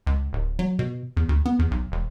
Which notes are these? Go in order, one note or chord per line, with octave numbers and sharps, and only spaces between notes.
C#2
D1
F#3
B2
E2
D2
B3
E2
B1
E1